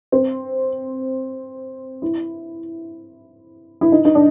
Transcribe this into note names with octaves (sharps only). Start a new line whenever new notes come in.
C4
E4
E4
D#4
D#4
D4